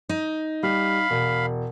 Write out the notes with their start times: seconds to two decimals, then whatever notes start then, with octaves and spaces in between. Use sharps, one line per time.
0.09 D#4
0.63 G3 F5 B5
1.10 E1